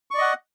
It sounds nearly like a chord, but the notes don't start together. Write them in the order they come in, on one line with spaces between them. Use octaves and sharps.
C#6 D5 D#5 F#5